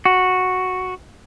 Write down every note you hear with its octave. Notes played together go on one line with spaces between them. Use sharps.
F#4